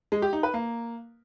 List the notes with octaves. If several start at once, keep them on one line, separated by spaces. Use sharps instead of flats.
G#3
G4
D#4
B4
A#3